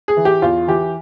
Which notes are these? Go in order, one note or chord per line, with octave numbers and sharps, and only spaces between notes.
G#4
E3
G4
E2 F4
E3 G4